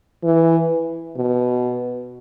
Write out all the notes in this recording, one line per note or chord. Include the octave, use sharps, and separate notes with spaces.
E3
B2